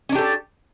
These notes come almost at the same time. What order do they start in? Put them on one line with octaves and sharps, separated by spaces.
C#4 D4 G4 A4